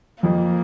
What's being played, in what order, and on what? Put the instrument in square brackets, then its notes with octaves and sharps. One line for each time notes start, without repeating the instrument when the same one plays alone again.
[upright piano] F2 F3 [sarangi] A#3